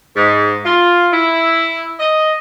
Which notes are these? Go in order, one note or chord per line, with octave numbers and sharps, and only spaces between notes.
G#2
F4
E4
D#5